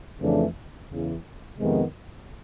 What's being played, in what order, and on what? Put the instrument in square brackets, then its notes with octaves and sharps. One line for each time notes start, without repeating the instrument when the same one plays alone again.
[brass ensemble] F2 C#3 E3 A3 D4
E2 C#3 E3
F2 C3 D#3 G#3 B3